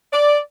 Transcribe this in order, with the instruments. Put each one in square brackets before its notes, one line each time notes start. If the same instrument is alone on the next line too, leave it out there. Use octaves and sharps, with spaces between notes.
[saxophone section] D5